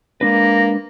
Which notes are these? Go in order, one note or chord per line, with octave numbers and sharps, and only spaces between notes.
G#3 A#3 D4 B4 A#6